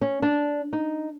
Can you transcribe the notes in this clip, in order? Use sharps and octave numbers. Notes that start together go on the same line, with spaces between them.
C#4
D4
D#4